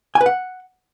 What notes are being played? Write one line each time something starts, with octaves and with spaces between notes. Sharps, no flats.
G#5
B4
F#5